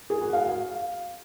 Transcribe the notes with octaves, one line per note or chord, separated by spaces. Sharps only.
G#4
F#4
F5
F5